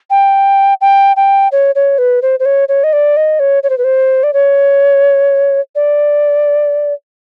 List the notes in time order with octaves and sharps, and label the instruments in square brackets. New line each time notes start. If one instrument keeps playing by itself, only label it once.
[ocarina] G5
G5
G5
C#5
C#5
B4
C5
C5
C#5
C#5
D#5
D5
D#5
C#5
C#5
C5
B4
C5
D5
C#5
D5